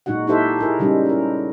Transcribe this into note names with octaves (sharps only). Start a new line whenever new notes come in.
A#2 G#3 D#4 F#4 F#5
D#4 E4 G4 A4 C5 E5
E4 G#4 A#4
C#3 G3 G#3 C#4 D#4
E4 A#4